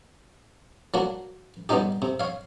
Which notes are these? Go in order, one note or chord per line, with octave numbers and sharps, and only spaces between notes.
F#3 A#3 D4 F#4
G3 B3 C#4 D#4 G4
C3
C#5 F5